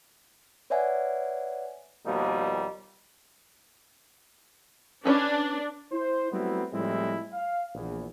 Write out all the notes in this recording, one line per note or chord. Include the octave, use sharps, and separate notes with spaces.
B4 C#5 D5 E5 F#5 G#5
D#2 B2 F3 G3 A#3 D#4
C#4 D4 B4 C#5
E4 C5
F#3 G3 A3 B3 C4 E4
A2 F3 G3 G#3 C4 E4
F5
A#1 E2